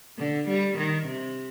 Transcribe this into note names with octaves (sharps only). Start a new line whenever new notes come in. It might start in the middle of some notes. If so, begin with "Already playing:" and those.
D3
G3
D#3
C3